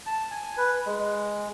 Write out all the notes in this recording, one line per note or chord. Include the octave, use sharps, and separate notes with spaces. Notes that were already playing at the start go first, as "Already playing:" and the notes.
A5
G#5
B4
G#3